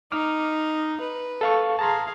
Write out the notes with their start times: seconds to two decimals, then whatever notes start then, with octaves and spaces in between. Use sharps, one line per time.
0.12 D#4 D6 F6
1.00 B4
1.41 A4 F5 C#6
1.79 G#4 F5 A5 A#5 C6